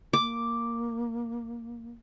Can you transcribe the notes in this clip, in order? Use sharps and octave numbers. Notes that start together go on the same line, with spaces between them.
A#3 D6